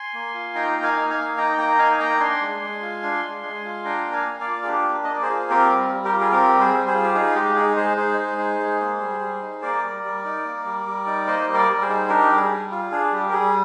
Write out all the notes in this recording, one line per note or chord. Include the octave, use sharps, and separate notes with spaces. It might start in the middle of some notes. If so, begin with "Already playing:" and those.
Already playing: G#5 C6
A#3
F4
D#4 G5 A#5
A#3
F5 G#5
D#4
F5 G#5
A#3
D#4 G5 A#5
A#3 G5 A#5
D#4 F5 G#5
G#5
A#3 G5 A#5
D4 G#5 C6
G#3
G#3
F4
D4
G#3
G#3
F4
D4 G5 A#5
A#3
F5 G#5
A#3
D5 F5
F4
G#4
D4 G4
A#3
D#5
A#3 D5
G#4 C5
F4
C4 G4 A#4
G3
G3
G4 A#4
F4
G#4
C4 G4 A#4
G3
G#4 C5
G3
G#4 C5
F4
G4
D#4 G#4
G#3 G4
D#4 G#4
G#3 G#4 C5
D#4 G#4 C5
G#3
D#4
G#3
A#3
G3
G3
D#4
A#3 A#4 D5
G3
G3
D#4
A#3
G3
G3
D#4
A#3 C5 D#5
G3
A#4 D5
G3
G#4 C5
D#4
D4 G4 A#4
G3
G#4
G3
F4
D4 G#4
G3 G4
A#4
G3 G#4